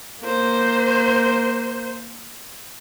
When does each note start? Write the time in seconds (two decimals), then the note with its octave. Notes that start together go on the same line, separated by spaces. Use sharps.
0.22 A#3 C5